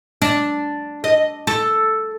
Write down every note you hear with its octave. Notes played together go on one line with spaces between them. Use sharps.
D4
D#5
A4